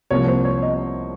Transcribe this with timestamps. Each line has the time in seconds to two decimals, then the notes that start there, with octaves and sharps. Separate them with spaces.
0.11 C2 C3 F3 A#3 C#5
0.28 C5
0.45 C#5
0.62 D#5